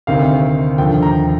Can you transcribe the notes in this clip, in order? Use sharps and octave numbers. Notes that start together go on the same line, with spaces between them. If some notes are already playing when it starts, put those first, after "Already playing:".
D2 C3 D#3 F5
D#2 D3 F3 G5
A#5